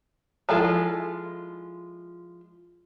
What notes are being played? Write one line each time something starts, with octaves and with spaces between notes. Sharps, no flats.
F3 G#3 E4 F4 A4